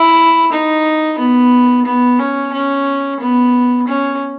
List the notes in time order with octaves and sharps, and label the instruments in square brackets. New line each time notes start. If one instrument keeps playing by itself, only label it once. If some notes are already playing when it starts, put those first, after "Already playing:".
Already playing: [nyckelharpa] E4
D#4
B3
B3
C#4
C#4
B3
C#4